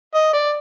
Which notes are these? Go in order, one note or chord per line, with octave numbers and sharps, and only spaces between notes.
D#5
D5